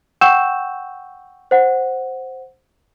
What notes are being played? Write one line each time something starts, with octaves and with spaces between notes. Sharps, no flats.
F#5 G5 C#6 E6 G6 E7
C5 F#5